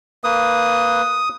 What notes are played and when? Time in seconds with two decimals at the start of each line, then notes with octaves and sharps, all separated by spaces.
0.24 A#3 B4 D#6